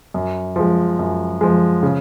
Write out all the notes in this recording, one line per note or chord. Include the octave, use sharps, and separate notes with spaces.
F#2
F3 G#3
F#2
F3 G#3
C#3